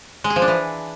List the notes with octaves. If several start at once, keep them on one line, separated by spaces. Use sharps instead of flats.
G#3
G#4
F3
D4
E3